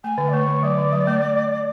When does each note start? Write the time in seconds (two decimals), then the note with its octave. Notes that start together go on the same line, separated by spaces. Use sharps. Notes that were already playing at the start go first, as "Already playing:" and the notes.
0.04 A3 G#5
0.18 D3
0.28 D5
0.33 A3 C#5
0.48 D3
0.63 F#3 D5
0.78 D3
0.92 F#3
1.07 A3